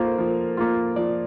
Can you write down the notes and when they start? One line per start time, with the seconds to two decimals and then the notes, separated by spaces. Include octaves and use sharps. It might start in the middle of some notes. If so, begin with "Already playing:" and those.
Already playing: A#3 F4 A4 A#4 C5
0.18 F3
0.57 A#3 F4
0.96 F3 D5